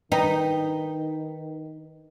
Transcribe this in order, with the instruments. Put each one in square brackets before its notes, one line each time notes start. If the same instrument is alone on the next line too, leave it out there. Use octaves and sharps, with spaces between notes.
[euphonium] D#3 [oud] D#4 [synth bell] B4 G5